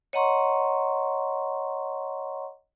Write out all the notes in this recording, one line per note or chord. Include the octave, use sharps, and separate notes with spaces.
C#5 D#5 F#5 A#5 C6 C#6